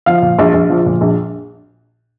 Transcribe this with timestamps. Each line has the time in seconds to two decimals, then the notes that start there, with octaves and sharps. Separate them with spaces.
0.06 F3 F5
0.22 A#2
0.39 A#1
0.54 A#1
0.70 F3
0.86 A#2
1.01 A#1